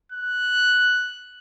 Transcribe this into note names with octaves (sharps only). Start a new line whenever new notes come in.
F#6